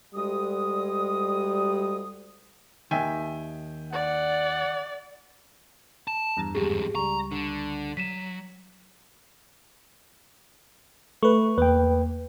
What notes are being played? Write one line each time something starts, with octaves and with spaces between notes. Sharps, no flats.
D2 G3 G#3 D#6
D#2 G#2 D#3 E5 G5 G#5
D5 F#5
A5
E2 G2 A#5
F2 G#2 G4 G#4
C#2 G3 A#5 C#6
D3
F#3 B6 D#7 E7
A3 B4 C#6
E2 A#3 B4 G5